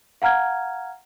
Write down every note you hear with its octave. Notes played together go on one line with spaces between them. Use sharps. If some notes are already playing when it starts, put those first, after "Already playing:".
F5 F#5 A#5 F6 G#6